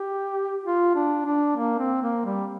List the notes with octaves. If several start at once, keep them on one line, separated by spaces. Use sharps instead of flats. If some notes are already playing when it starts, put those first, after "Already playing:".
Already playing: G4
F4
D4
D4
A#3
C4
A#3
G3